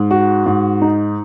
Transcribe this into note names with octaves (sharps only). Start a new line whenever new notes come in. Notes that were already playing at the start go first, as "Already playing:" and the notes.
Already playing: G#2
F#4
G#2
D#4